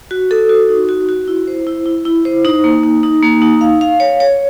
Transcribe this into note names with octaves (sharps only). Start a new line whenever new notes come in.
F#4
A4
F#4
D#4
F#4
F#4
E4
C5
E4
E4
E4
C5
D#4
A#3
D#4
D#4
A#3
D#4
F5
F5
C#5
C#5